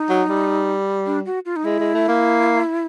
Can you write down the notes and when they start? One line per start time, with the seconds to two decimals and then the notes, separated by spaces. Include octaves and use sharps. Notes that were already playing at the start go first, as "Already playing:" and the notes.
Already playing: D#4
0.09 F#3
0.29 G3
1.06 D4
1.26 F#4
1.45 F4
1.56 D#4
1.65 G#3 E4
1.80 G#3
1.94 A3
2.08 A#3